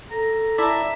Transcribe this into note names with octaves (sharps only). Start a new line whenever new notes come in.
A4 A#5
E4 D5 E5 A5 A#5